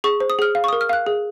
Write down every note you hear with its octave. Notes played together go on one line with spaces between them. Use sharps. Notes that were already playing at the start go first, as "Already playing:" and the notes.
G#4 C#6
C5
D#6
G#4 F6
F5
C#6
D#6
A#4
F6
F5 F#6
G#4